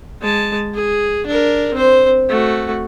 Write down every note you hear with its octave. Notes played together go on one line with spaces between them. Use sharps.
G#3 A5
G#4
D4 A#4
C4 C5
A3 F#4